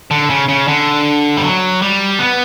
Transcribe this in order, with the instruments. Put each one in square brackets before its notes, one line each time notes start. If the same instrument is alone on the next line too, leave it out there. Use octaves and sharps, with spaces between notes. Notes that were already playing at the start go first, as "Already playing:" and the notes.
[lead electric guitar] D3
C#3
C#3
D3
G3
F#3
G3
B3